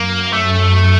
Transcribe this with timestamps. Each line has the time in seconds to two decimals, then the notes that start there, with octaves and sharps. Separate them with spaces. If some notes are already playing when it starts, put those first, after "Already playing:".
Already playing: F#2 A#3
0.33 A3